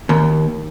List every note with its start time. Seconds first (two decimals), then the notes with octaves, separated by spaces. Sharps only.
0.09 D#2